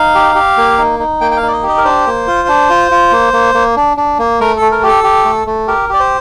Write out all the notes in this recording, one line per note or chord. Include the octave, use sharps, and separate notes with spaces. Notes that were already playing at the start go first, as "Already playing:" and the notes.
Already playing: D#4 F5
G4
G4
A#3
D#4
D#4
A#3 G5
G5
F5
D#4 D5
D#5
G4
D#5
A#4
D4 C5
A#3
F4
D4
F4
F4
A#3
A#3
A#3
D4
D4
A#3
A3 A#4
A3 A4
A#4
G4
A4
G4
A3
A3
G4 A#4
G4 D5
C5